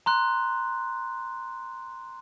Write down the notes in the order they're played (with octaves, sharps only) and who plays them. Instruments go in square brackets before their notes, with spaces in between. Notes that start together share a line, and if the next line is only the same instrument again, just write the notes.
[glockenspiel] A#5 C6 F#6